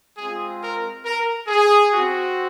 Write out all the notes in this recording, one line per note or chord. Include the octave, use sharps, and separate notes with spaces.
G#3 C4 F4 G#4
A#4
A#4
G#4
C4 F#4